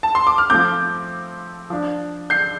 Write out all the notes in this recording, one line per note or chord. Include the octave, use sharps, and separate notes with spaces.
A5
C6
D6
F6
F3 A3 C4 D6 G6
F3 D4
G6 C7